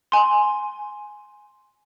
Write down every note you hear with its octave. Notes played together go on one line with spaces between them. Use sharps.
G#5 C6